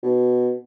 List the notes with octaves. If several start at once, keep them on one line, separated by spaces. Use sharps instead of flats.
B2